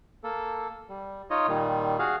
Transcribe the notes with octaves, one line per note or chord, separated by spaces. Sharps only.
A#3 A4
G3
D#4 F4 C#5 D#5
A#2 D#3 G3
F#4 G#4 F5